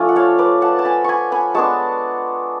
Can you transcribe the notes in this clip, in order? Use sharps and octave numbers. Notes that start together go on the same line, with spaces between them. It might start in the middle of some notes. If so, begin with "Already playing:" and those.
Already playing: F3 A3 D4 F4 G#5
F#5
C#5 F5
B4 D5
F#5 A5
A5
G#5 B5
G#5 B5 C#6
G#5 B5
G#3 B3 D4 A5 C#6